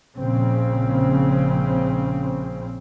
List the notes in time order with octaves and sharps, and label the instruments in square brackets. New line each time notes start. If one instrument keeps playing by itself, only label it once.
[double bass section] A#1 C#3 C4